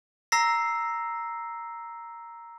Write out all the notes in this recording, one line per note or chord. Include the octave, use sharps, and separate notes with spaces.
A#5 E6 A#6 C7